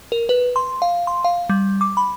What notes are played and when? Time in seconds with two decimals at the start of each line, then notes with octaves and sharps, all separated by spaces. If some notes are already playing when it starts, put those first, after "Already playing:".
0.12 A#4
0.29 B4
0.56 C6
0.82 F5
1.07 C6
1.24 F5
1.50 G3
1.81 D6
1.97 B5